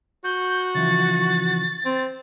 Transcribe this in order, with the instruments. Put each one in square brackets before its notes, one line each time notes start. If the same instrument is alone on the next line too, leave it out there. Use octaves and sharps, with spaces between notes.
[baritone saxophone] F#4 [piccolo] G6
[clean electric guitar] C#3 E3 F3 [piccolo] A6
[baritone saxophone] C4